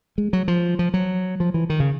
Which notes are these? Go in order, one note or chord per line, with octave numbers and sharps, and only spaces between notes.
G#3
F#3
F3
F3
F#3
F3
E3
D#3
C#3